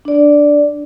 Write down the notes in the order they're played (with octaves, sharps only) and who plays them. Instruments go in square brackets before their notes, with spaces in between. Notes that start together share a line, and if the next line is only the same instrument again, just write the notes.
[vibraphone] D4 D5